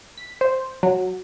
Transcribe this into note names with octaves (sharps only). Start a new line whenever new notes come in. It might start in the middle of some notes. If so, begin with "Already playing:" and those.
B6
C5
F#3